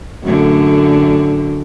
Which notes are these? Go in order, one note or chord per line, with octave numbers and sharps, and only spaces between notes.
F#2 A2 D3